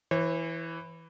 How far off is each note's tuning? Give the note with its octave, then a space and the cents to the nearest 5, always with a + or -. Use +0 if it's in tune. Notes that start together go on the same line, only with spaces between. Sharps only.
E3 +0 C#5 -45